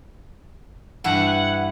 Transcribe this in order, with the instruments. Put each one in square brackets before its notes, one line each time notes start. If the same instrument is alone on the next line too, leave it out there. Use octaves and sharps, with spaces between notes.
[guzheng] G2 E3 E4 [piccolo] F#5